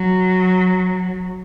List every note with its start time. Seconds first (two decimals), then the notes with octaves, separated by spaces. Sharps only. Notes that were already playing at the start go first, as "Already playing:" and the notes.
Already playing: F#3